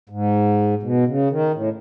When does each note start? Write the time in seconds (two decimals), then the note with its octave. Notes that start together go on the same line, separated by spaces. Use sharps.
0.09 G#2
0.83 B2
1.07 C#3
1.30 D#3
1.54 A2